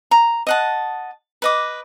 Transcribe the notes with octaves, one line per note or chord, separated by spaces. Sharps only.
A#5
D#5 F#5 A5
B4 D#5 D6